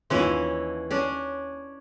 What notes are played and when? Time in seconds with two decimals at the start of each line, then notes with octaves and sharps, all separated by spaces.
0.10 D#2 E3 C#4 E4 F4 C6
0.91 C#4 D4